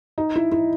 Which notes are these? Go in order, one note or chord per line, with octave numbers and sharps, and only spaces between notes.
D#4
E4
E4